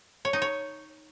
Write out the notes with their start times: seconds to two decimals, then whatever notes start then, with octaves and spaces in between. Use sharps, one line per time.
0.25 C#5
0.33 D#4
0.42 C#5